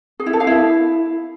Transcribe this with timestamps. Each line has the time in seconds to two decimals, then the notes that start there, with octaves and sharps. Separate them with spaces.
0.20 G#4
0.26 E4
0.33 A4
0.40 F5
0.47 E4